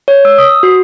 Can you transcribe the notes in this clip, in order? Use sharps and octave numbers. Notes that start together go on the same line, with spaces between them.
C#5
E6
D#6
F#4